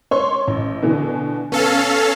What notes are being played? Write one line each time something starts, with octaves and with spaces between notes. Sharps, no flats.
C#5 C6 C#6
A1
B2 D3 E3
B3 C#4 A4 F5